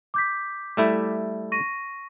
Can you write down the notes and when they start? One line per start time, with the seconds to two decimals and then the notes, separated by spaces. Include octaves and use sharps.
0.14 D6 G6 B6
0.77 G3 A3 E4
1.52 C#6 A#6 D#7